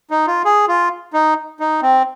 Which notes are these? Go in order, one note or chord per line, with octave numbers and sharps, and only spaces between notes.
D#4
F4
G#4
F4
D#4
D#4
C4